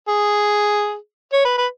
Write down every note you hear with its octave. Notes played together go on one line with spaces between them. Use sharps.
G#4
C#5
B4
B4